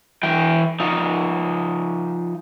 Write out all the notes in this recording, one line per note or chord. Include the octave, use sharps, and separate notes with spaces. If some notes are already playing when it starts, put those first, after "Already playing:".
E3 G5
F3 D#4